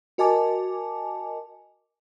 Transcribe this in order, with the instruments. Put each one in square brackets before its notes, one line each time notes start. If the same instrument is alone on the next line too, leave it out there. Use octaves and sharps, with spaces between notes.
[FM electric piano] F#4 A#4 D#5 G#5 A5 D6